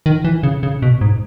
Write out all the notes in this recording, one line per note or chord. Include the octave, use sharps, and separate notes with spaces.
D#3
E3
C#3
C#3
B2
G#2